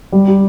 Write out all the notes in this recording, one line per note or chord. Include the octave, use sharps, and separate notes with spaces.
G3
G4